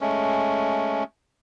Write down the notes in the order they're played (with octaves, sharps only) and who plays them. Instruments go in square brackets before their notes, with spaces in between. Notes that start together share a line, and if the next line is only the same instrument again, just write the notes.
[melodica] G#3 A3 C#4